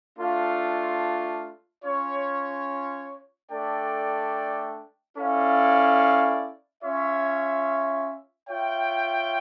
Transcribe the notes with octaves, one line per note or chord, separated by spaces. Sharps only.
A3 D4 F4
C#4 F4 C#5
A3 D4 A4 D5 G5
C#4 E4 A4 D5 F5
C#4 F4 C#5 E5
F4 C#5 E5 G5